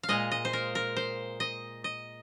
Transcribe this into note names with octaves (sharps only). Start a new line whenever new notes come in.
F5
A#2 G#3 D#5
D#5
C5
A#4
A#4
C5
D#5
D#5